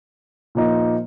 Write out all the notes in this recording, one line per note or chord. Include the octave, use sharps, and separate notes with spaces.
A#2 F3 A#3 D#4